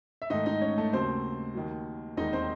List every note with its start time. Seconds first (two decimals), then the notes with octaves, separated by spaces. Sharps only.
0.22 E5
0.30 G#2 D#3 A3 D#4 D#5
0.46 D#4 D#5
0.61 C#4 C#5
0.78 A3 A4
0.93 D#2 C#3 F#3 C4 C5
1.54 D#2 D#3 F#3
2.17 E1 D#2 D#3 G#3 D#4 D#5
2.33 C4 C5